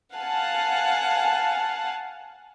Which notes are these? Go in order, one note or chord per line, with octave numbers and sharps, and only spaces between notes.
F5 F#5 G#5 A5